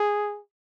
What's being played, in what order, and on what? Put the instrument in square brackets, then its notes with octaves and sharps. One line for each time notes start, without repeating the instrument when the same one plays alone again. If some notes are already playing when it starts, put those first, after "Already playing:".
Already playing: [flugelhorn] G#4